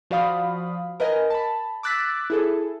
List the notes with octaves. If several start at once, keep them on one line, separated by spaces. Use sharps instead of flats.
F3 F#4 D5 F5 B5 D#6
A#4 B4 D#5 G#5
A5 B5
D6 E6 F#6 A6 B6
E4 G#4 A4